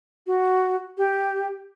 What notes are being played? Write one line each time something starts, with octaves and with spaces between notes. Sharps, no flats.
F#4
G4